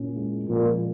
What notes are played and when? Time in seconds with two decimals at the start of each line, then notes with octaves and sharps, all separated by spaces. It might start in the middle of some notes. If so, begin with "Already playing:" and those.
Already playing: A#2 C#4
0.16 G#3
0.49 A#2 F3